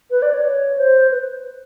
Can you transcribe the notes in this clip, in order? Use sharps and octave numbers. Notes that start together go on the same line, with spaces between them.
B4
D5
C#5
C5
B4